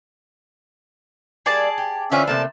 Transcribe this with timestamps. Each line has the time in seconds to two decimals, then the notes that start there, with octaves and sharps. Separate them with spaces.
1.46 G3 A#3 E4 G#4 D5 A5
1.78 G4
2.12 D3 E3 C4 C#4 F4 D5 E5 G#5
2.27 C3 A3 A#3 A5